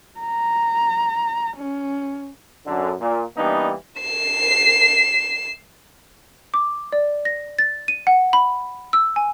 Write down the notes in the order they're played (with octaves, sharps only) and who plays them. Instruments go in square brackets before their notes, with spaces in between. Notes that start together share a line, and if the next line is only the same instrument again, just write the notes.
[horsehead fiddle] A#5
C#4
[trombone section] F#2 D3
A#2
E3 G3 A#3 B3 D4 D#4
[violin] C7 E7
[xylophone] D6
D5
A#6
A6
D#7
F#5
B5
E6
G#5